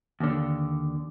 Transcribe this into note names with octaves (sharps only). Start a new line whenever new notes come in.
D#2 D3